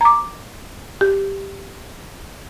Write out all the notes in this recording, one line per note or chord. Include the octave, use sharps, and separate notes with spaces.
A#5 D6
G4